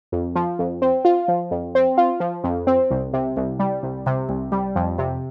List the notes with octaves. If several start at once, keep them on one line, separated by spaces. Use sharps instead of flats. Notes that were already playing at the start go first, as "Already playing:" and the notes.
F2
F3
F2
C4
F4
F3
F2
C4
F4
F3
F2
C4
C2
C3
C2
G3
C2
C3
C2
G3
F2
C3